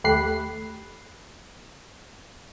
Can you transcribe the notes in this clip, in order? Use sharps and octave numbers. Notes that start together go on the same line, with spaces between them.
D#2 A3 G4 B5 F#6 C7